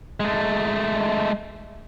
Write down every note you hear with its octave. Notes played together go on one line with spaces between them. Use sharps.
G#3 A3